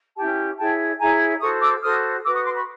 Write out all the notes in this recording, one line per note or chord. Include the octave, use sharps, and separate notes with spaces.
C#4 E4 G4 G5 A5
E4 G#4 C#5 G5 A5
E4 G#4 C#5 G#5 A#5
F#4 A4 C5 C#6 D#6
D6 E6
F#4 A4 C5 D#6 F6
F#4 B4 D6 E6
C#6 D#6
C6 D6
B5 C#6